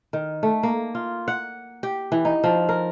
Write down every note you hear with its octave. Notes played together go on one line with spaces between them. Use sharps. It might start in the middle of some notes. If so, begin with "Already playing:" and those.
D#3
A3
A#3
F4
F#5
G4
E3
D#4
F3
A#4